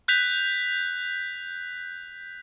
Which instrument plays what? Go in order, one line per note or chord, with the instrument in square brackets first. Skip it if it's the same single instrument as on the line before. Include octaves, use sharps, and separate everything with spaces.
[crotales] F#6 G6 B6 F7